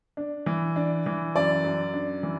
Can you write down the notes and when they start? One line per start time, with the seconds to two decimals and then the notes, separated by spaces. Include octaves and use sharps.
0.17 D4
0.46 E3
0.76 D4
1.06 E3
1.35 F#2 D5
1.64 F#2
1.94 D4
2.23 E3